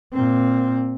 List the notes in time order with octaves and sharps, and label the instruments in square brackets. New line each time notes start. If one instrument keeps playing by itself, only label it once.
[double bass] A#2 C4